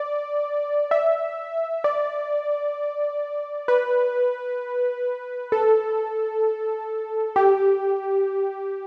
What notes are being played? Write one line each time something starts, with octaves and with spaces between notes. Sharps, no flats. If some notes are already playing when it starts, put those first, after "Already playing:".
Already playing: D5
E5
D5
B4
A4
G4